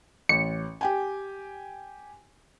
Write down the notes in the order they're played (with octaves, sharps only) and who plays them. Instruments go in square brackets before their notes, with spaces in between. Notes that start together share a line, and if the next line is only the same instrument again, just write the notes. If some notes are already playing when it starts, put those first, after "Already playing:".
[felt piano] A1 [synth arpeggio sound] C#7
[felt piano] G4 G5 G#5